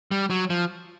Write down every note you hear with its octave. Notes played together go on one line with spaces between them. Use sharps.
G3
F#3
F3